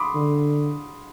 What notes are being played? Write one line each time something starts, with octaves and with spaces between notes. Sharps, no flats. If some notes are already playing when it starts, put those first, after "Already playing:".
Already playing: B5 C6 D6 D#6
D3